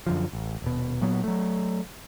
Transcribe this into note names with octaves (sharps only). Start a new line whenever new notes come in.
F#2 D3 F3
A1
D#1 B2
A#2 F#3 B3
F#3 A3